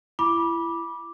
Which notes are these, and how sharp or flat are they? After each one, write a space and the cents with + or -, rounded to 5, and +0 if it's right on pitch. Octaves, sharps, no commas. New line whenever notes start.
E4 +30 B5 -20 D6 +0